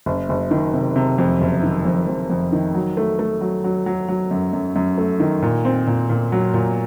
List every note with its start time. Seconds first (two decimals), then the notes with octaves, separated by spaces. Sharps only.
0.06 F#1
0.29 F#1
0.51 D#3
0.74 C3
0.96 C3
1.18 F2
1.41 F#1
1.63 D#3
1.85 F2
2.07 F2
2.30 F2
2.52 D#3
2.74 F#3
2.97 A3
3.19 A3
3.41 F#3
3.64 F#3
3.86 F#3
4.09 F#3
4.31 F#2
4.53 F#2
4.76 F#2
4.98 A3
5.20 D#3
5.42 A#2
5.65 C4
5.87 A#2
6.10 A#2
6.32 F#3
6.54 A#2